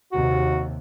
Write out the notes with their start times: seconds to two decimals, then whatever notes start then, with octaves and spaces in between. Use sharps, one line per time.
0.12 D#2 C3 F#4